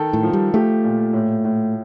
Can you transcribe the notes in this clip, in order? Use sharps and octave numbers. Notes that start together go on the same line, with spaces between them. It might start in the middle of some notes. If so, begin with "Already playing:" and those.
Already playing: D#3 A4
A2
F3
G3
A3 G4
A#2
A2
A2